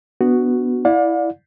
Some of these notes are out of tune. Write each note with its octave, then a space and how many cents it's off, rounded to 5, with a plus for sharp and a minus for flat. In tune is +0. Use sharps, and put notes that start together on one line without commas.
B3 +0 D4 +0 F#4 +0
E4 +0 D5 +0 F5 +45